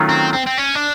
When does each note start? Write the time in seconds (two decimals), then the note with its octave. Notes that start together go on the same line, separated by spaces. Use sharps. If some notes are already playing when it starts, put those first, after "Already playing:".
Already playing: D#3 F#3 A3 C#4 F4
0.09 C4
0.33 C4
0.47 C4
0.58 C#4
0.76 D4